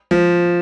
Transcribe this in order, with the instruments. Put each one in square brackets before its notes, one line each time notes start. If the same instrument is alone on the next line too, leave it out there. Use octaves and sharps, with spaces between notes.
[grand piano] F3